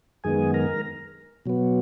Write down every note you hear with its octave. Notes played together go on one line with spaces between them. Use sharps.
F#2 D#3 G#3 B3 G#4 G#5
A#4 A#5
B2 F#3 B3